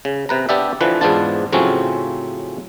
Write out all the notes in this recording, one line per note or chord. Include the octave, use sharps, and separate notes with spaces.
C#3
C3 B4 A#5
B3 D4 G4 D5 E5
D3 E3 F3 B4
E2 G#2 B3 D4 F4 A5
A2 C#3 F3 F#3 C4 C#4